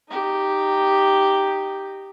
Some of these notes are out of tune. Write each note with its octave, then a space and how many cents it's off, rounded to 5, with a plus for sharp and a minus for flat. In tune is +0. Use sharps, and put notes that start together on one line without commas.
D#4 -10 G4 +0